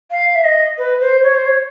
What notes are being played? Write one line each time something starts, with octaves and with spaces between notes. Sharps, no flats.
F5
E5
D#5
B4
C5
C#5
C5
C#5